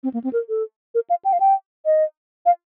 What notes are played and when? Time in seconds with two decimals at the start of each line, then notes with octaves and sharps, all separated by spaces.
0.04 C4
0.14 A#3
0.24 C4
0.33 A#4
0.49 A4
0.95 A#4
1.10 F5
1.25 G5
1.33 F5
1.40 G5
1.86 D#5
2.46 F5